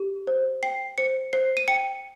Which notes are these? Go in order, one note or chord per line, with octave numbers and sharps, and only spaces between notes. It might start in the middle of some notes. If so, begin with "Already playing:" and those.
Already playing: G4
C5
G5 C7
C5 C#7
C5 C7
D#7
G5 C#7